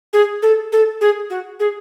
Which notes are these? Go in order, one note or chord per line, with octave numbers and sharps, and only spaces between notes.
G#4
A4
A4
G#4
F#4
G#4